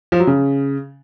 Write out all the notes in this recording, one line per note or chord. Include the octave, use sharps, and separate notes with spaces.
F3
F#3
C#3